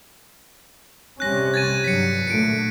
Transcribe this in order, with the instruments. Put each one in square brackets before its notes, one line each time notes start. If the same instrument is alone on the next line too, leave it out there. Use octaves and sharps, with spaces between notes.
[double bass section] C3 G3 C#4 [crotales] F#6 A#6
[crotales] G#6 A6 D#7
[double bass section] G2 D3 F#3 [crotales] B6 C#7
[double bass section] A#2 D3 A3 [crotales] C#7 D7